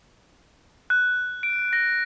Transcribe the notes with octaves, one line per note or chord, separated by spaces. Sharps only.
F#6
D7
A#6